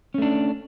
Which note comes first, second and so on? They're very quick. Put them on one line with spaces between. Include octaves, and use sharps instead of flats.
C#4 A3 D4